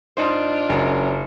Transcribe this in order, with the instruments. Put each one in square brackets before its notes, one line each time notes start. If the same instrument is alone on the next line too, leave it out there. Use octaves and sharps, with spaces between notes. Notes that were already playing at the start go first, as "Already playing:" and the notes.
[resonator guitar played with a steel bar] G#2 D#4 C5 [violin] D4 F4
[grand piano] F#1 [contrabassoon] F#2